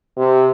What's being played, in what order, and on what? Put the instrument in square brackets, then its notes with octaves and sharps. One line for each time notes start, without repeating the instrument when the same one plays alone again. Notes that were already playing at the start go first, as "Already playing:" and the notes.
[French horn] C3